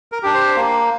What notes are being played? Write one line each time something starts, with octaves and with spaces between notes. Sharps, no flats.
A#4
D4 G4
C5
A#3